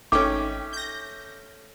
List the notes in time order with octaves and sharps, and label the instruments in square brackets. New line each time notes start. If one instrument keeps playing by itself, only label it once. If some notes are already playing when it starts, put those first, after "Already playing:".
[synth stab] G#1 D#4 G5 [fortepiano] A3 C#4 [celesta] D6
[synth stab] G6 A#6